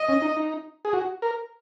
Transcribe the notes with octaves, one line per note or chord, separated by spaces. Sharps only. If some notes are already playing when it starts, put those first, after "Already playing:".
Already playing: D#5
C#4
D#4
D#4
G#4
F#4
A#4